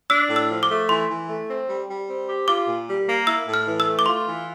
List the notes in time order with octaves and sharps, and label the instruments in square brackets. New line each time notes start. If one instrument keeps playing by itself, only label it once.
[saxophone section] D4 [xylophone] E6
[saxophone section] A2
[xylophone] E6
[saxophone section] F3
[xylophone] D6
[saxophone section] A3
[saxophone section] E3 [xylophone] C6
[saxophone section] E3
A3
C4
G3
G3
C4
G4
[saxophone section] F4 [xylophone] D6
[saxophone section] A#2
G3
A#3
[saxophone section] E4 [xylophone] E6
[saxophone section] A2
[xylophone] F6
[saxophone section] E3
[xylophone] E6
[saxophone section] A3
[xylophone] D6
[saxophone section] F4 [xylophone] C6
[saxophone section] E3